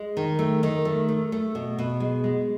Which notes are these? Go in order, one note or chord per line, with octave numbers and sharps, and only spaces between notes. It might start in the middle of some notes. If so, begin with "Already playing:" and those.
Already playing: G#3
D#3
A3
D#3
A3
A3
A3
B2
B2
G#3
G#3